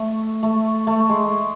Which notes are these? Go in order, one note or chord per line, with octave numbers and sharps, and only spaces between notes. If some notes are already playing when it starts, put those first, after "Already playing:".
Already playing: A3
A3
A3
G#3